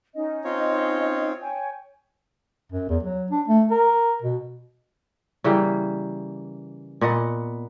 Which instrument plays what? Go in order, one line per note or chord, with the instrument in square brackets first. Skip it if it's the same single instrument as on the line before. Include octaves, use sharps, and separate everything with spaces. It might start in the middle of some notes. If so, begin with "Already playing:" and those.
[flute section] C#4 D#4 D#5
[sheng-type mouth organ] C4 F4 C#5
[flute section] C#5 G5 G#5
[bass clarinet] F#2
E2
F#3
D4
A3
A#4
B2
[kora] C#3 E3 G3 A#3
A#2 B3 D#5 F#5